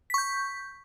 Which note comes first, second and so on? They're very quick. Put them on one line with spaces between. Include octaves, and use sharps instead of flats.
B6 C#6 G6